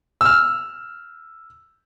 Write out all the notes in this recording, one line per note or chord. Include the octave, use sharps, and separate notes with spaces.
E6 F6